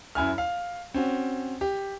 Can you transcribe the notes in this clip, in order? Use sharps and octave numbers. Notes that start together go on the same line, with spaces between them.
F#2 E4 G#5 F6
F5
C4 C#4 F#4
G4